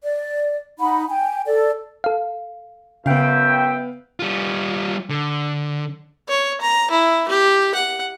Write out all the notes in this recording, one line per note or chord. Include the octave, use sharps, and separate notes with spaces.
D5
D#4 F#5 B5
G5 G#5
A4 D5
A4 F5
F#2 C#3 B3 E5 F5 G5
G3 F4
D3
C#5
A#5
E4
G4
F#5